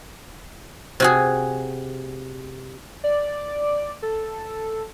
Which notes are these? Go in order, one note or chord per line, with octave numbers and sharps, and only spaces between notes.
C3 F#4 G#4
D5
A4